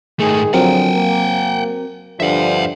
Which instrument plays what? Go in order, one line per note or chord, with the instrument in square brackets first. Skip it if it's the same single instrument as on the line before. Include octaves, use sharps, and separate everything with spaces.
[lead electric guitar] G#2 A3 [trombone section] D#3 G#3 G#4
[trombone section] D3 F3 [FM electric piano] F#3 C4 A#4 [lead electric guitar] F#5 G5
[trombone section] A#3
[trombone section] G2 D3 F3 [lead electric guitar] E5 F#5